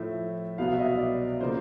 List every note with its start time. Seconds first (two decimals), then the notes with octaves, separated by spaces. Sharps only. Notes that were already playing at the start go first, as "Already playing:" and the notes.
Already playing: A2 F3 A3 E5
0.58 C2 B2 F#3 B3 F5
0.72 E5
0.79 D#5
0.85 E5
0.99 D5
1.41 C#3 F3 A#3 C5